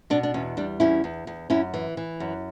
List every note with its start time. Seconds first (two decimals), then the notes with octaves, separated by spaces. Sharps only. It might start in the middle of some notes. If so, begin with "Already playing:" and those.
0.10 B2 D4
0.23 D4
0.34 E2 C#4
0.57 G3 D4
0.80 E2 C#4 E4
1.04 E2
1.27 E2
1.50 F#2 C#4 E4
1.74 E3
1.97 E3
2.20 F#2